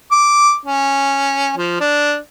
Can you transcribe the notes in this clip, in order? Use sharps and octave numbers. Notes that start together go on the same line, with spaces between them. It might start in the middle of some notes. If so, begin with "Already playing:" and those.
D6
C#4
F3
D4